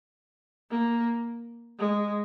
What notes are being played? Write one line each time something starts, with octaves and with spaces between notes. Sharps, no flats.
A#3
G#3